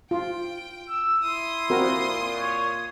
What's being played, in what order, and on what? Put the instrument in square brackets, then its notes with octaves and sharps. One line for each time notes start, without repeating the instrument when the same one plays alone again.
[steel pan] F4 [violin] G5
[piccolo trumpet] E6
[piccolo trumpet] E4 [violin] C6 D#6
[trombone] A#2 [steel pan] C4 F#4 A#4
[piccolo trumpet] C#5